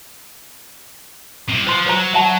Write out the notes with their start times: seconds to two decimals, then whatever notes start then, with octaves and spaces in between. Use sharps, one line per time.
1.49 C3 E4
1.67 F3 C5 C6
1.86 F#3 C5 C#5 A#5
2.14 F#3 E5 F#5 A5